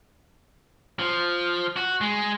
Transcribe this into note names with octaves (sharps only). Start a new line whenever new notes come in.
F3
F#4
G#3